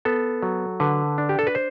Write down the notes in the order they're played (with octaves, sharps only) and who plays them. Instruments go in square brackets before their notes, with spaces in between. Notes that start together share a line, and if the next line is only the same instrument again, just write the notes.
[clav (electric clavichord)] B3 A4
F#3
D3 B4
D4
G4
A4
B4
C5